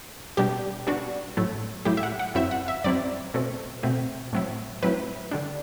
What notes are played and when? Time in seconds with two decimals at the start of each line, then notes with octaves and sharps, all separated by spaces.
0.37 B2 G3 D4 G4
0.87 B2 G3 D4 F#4
1.37 A2 F#3 A3 E4
1.85 A2 F#3 A3 E4 G4
1.97 E5
2.03 F#5
2.19 F#5
2.35 F#2 F#3 C4 E4 E5
2.51 F#5
2.68 E5
2.84 F#2 F#3 C4 E4 D5
3.34 B2 A3 C4
3.83 B2 A3 C4
4.33 A2 F#3 C4 E4
4.83 A2 F#3 C4 E4 B4
5.31 D3 G3 D4